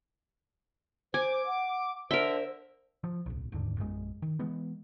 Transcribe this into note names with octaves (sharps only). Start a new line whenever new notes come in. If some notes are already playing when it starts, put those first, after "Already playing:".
C5 G#5 D6
F#5
D3 A#4 C5 E5
F3
D1 B1
E1 D#2 G#2 D3
A#1 F#2 G#3
D#3
E3 G#3 B3